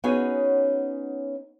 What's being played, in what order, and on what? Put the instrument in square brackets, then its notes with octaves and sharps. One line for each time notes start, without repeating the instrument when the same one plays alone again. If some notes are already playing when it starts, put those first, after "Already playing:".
[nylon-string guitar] B3 C#4 D#4 F#4 G#4 C#5